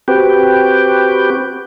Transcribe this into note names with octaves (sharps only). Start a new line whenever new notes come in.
C4 F#4 G4 B4 G5